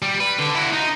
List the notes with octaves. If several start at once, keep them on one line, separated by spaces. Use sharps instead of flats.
G3
B4
D3
E4 F#4
D#4